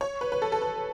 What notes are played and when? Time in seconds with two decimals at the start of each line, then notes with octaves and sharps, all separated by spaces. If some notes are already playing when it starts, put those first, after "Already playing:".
0.01 C#5
0.21 B4
0.32 B4
0.42 A4
0.52 A4
0.62 B4